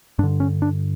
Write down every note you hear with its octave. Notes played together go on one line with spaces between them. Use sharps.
G2 D3 D4
C#4
D4